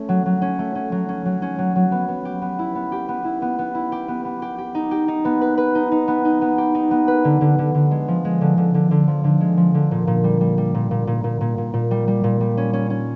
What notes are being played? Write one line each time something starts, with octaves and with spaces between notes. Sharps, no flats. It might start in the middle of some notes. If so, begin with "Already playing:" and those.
Already playing: A3 C#4
F#3
F#3
C#4
A3
C#4
F#3
C#4
F#3
C#4
F#3
F#3
B3
B3
G4
B3
E4
B3
G4
B3
E4
B3
B3
E4
G4
B3
B3
G4
G4
D#4
G4
D#4
B3
B4
B4
D#4
D#4
B3
D#4
B3
G4
D#4
B3
B4
D3
D3
D3
D3
G#3
F3
G#3
D3
D3
D3
D3
F3
D3
G#3
F3
D3
A#2
A#2
G3
G3
G3
A#2
A#2
A#2
A#2
A#2
A#2
A#2
G3
G3
A#2
G3
C#4
C#4
C#4